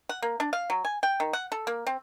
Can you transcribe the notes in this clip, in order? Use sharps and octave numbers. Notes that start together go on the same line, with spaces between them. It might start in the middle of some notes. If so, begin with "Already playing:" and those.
F#5
A#3
D4
F5
F#3
G#5
G5
D#3
F#5
A4
A#3
C4